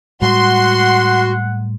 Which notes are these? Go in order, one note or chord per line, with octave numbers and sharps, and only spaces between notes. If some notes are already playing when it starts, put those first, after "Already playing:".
A2 G3 G#3 F#4 F#5 C6